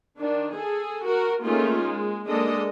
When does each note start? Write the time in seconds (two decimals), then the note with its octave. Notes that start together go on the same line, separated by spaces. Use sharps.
0.19 D#3 D4
0.53 G#4 A4
1.06 F#4 A#4
1.44 A3 A#3 C#4 D#4 F4 G#4
1.82 G#3
2.28 G#3 A#3 D4 A4 D#5